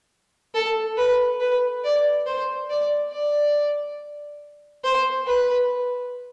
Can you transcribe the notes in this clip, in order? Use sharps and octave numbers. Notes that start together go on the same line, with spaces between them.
A4
B4
B4
D5
C5
D5
D5
C5
B4